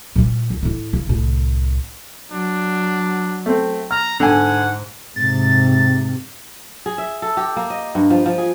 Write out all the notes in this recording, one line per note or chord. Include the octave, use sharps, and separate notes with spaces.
A#2 G3
C#2
A2 E4
C#3
C2 A2
F#3 D4
A3 C4
A#5 F6
G#2 D3 F#5 G#5
G#2 C3 A6
G#4
E5
A4
G4
A#3
D#5
G2
F3
F3
G#4